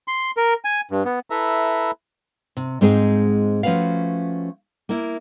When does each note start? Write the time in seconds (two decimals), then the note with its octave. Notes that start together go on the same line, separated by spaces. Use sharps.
0.08 C6
0.37 A#4
0.65 G#5
0.91 G2
1.05 B3
1.30 E4 A4 B4 E5 A#5
2.57 C3
2.81 G#2 G#3 C4 D#4 G#4 C5
3.63 F3 A3 C#4 F#4 B4 F5
4.89 A#3 E4